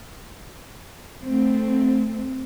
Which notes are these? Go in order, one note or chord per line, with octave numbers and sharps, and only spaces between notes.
A3 C4